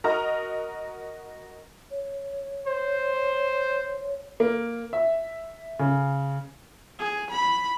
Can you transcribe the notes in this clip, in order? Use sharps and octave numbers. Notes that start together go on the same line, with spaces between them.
F#4 A#4 D#5 A#5 F6
C#5
C5
A#3
E5
C#3
G#4
B5